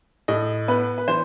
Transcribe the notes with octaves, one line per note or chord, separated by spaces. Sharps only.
A2 D#5
B3 B4
B4
E3 C5